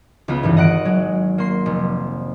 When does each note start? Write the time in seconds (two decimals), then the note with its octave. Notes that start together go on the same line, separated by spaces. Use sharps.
0.28 C#2 B3 F4
0.43 G#1 G2 E3
0.57 D#5 F#5 F#6 D7
0.85 F#3 G#3
1.38 A#3 C6 C7
1.66 F1